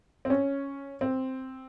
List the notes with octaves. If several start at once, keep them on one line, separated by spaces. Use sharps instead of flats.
C4
C#4
C4